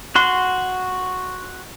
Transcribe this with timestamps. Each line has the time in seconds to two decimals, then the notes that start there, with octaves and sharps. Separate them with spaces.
0.15 F#4 F#5 C6